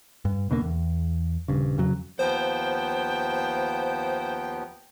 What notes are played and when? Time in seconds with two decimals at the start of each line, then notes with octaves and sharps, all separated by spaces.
0.25 G2
0.50 D#2 B2 D3 A#3
0.62 E2
1.48 D#1 G2 C#3
1.78 F2 C#3 F#3
2.19 D#2 F3 B3 C5 G5